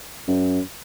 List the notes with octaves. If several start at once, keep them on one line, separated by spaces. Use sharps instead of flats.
F#2